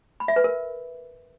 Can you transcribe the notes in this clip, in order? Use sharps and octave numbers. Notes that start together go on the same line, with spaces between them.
B5
E5
B4
A#4